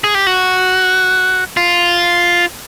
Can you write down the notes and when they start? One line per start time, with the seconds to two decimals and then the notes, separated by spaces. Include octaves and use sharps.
0.04 G#4
0.15 G4
0.27 F#4
1.57 F4